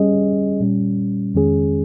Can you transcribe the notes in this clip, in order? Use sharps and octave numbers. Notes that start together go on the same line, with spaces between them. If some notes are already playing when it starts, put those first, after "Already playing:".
Already playing: G3 C#4 G#4 D#5
A#2 G3 C#4
F2 D#3 G#3 C#4 G#4